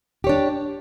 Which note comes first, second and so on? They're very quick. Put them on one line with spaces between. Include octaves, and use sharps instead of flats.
G4 C#5 D4